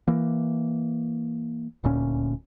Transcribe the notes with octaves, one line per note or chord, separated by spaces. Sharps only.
E3 A#3
D#1 D2 A#2 C#4